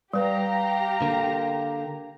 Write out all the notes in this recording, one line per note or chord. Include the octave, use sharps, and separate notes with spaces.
G3 G4 B4 F5 A#5
D3 A#3